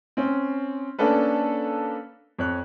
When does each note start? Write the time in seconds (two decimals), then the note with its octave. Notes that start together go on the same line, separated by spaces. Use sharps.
0.17 C4 C#4
0.99 A#3 C#4 D4 A4 B4
2.39 F2 C#5 F#6